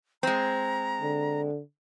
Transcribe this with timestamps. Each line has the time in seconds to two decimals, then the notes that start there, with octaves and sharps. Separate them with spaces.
0.23 G#3 C4 A#5
1.01 D3